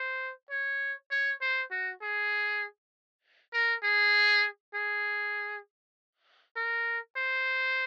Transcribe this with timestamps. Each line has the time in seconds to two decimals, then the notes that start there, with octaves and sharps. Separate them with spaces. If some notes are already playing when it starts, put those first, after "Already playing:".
Already playing: C5
0.51 C#5
1.11 C#5
1.41 C5
1.71 F#4
2.02 G#4
3.54 A#4
3.83 G#4
4.74 G#4
6.56 A#4
7.17 C5